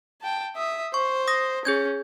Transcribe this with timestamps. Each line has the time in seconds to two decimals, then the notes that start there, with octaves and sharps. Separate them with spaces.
0.22 G5 A5
0.56 E5 D#6
0.94 C5 C#6
1.28 D#6 A#6
1.65 C#4 G#4 G6 G#6